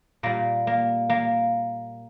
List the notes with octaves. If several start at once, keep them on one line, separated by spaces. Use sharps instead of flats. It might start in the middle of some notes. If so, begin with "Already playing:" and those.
A#2 G3 A#3
A#3
A#3